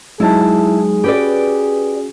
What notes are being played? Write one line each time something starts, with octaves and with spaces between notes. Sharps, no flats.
F#3 G#3 D#4 E4 G#4 A5
C#4 F#4 G4 B4 D5